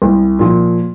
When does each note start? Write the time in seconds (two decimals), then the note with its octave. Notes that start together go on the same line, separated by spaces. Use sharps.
0.02 C2
0.39 A#2 F3